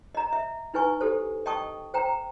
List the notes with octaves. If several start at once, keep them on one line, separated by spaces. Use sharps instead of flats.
D#5 A#5
E5
D#4 E4 B4 G#5 C#6
G4 A4 C5
D#5 G5 A5 C#6 D#6
C5 G5 A#5